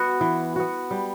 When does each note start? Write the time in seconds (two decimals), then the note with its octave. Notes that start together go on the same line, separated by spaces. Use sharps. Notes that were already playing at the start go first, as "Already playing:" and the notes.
Already playing: B3 F#4
0.21 E3
0.56 B3 F#4
0.91 G3